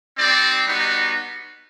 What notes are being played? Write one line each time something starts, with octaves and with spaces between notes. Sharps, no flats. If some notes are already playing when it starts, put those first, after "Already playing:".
G3 C4 D#4 D5
G3 B3 D#4 F#4